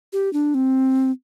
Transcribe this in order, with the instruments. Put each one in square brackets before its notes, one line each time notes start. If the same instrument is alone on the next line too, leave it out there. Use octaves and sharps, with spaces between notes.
[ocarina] G4
D4
C4